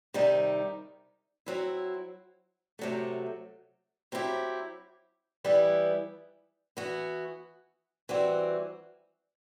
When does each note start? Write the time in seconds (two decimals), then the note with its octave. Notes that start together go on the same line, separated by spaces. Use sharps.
0.14 C3 D#3 G3 D#4
1.46 F#3 C4 E4
2.79 C3 F#3 A3
4.12 F#3 C4 E4 G4
5.44 E3 G3 B3 E4
6.77 E3 B3 F#4
8.09 E3 G3 C4 F#4